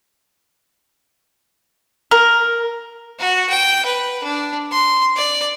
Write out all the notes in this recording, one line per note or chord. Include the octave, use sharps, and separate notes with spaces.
A#4
F#4
G5
B4
D4
C6
D5